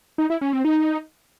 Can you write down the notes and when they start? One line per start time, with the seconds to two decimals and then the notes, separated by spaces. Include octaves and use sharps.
0.18 D#4
0.30 E4
0.41 C#4
0.53 C4
0.65 D#4